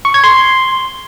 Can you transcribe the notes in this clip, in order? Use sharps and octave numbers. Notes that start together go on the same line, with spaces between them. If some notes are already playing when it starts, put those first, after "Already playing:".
C#6
G#6
C6